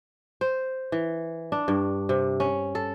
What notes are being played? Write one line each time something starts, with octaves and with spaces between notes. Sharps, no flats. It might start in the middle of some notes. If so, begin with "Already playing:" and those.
C5
E3
D4
G2
C3
C#4
A4